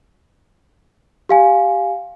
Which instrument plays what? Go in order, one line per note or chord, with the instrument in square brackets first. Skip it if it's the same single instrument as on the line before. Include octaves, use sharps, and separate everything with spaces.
[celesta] G4 F5 G#5